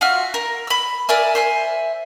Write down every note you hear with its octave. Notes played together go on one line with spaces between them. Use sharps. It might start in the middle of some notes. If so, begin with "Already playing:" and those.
F4 F#4 E5 F6
A#4
B5 E6
A#4 D5 E5 G#5
C5 E5 G#5